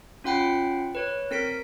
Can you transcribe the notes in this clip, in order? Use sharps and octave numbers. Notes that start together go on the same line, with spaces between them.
C#4 F4 F#5 G5 B5 C7
B4 C#5
C4 A#4 B6 D7